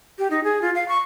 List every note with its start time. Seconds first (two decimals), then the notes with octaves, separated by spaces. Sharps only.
0.19 G4
0.31 D#4
0.44 G#4
0.62 F4
0.75 F5
0.88 C#6